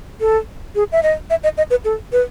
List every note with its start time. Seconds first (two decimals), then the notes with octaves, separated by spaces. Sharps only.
0.21 A4
0.75 G#4
0.92 E5
1.03 D#5
1.30 E5
1.44 D#5
1.58 D#5
1.70 B4
1.85 A4
2.12 B4